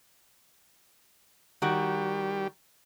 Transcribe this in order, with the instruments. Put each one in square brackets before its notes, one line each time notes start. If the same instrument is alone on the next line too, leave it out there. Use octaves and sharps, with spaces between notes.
[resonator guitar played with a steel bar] D#3 F#4 [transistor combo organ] G3